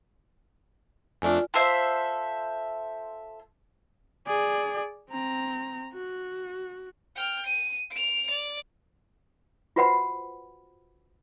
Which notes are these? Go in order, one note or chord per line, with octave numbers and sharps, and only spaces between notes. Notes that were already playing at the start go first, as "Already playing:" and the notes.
F2 A3 D4 F4 D5 G#5
F4 A4 C5 E5
G#4 D5
C4 A#5
F#4
G5 F6
D#7
D7 F7
D5
F4 F#4 B4 C5 F#5 B5